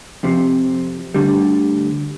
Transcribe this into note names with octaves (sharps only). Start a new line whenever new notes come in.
F2 C3 F3
D2 D3 G3